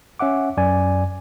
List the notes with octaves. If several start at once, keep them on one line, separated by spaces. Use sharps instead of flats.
C#4 E5 F#5 D6
F#2 D5 G#5